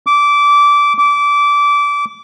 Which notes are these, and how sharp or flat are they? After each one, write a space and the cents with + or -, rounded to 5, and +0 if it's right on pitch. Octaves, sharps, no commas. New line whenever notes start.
D6 -15
D6 -20